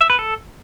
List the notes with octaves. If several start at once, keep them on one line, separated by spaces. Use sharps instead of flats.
E5
B4
A4